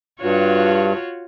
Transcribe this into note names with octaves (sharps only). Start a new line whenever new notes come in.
G2 F4 F#4 C#5